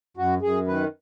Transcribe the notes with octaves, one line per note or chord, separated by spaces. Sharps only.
F#2 F#4
F#2 G#4
D#3 B4